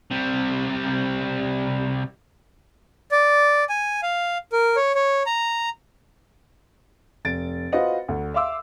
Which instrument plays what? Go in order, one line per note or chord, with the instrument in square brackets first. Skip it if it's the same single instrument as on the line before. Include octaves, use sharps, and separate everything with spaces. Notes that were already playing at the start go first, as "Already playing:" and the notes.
[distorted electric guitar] C3 G3
[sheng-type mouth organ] D5
G#5
F5
A#4
C#5
C#5
A#5
[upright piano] F1 A6 D7
F4 F#4 B4 C5 D#5 F#5
D2
E5 F5 C6 D6 E6